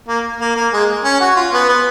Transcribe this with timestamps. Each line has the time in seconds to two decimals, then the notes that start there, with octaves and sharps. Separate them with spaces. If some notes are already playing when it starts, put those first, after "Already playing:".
0.08 A#3
0.41 A#3
0.56 A#3
0.73 G#3
1.04 C#4
1.21 F#4
1.36 F4
1.53 B3
1.69 B3